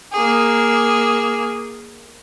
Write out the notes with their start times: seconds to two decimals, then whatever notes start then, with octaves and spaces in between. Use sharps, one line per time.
0.12 A#3 G#4